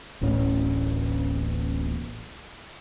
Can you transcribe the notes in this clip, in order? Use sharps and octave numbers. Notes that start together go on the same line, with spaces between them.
D1 A1 A2 C#4